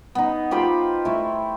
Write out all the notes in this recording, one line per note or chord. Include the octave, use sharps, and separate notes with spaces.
B3 D#4
F4 G4 C5 B5
A3 E4